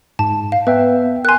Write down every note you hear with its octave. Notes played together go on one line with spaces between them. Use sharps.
G#2 A5
F5
B3 B4 E5 G5
A#4 G#5 C6 F#6